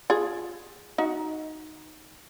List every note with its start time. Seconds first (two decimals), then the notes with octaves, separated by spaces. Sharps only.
0.10 F4 G#4
0.98 D#4 F#4